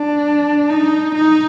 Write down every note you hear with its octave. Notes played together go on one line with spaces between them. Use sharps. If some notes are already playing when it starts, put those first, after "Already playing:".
Already playing: D4
D#4
D#4